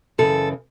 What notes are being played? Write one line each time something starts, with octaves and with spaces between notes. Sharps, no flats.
F#2 C#3 E3 A4